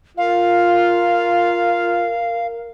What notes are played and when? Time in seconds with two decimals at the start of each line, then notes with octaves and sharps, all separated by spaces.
0.18 F4 A#4 F5